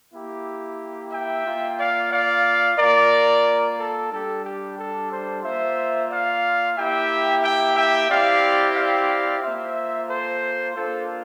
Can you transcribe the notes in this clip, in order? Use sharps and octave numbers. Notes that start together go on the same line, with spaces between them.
A#3 E4 G4
E5 G5
A#3 F4
D5 F5
D5 F5
A#3 F4 A#4 D5
A4
G3 D4 G4 A4
G4
A4
A4 C5
A#3 F4 C5 E5
D5 F5
A#3 E4 G4 E5 G5
E5 G5
E5 G5
C4 E4 G4 D5 F5
D5 F5
A#3 F4 C5 E5
A4 C5
A#3 D4 F4 A4 C5